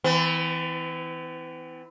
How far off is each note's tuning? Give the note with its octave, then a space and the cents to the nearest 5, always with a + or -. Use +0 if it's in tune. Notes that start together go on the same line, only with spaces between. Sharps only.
E3 -15 B3 +45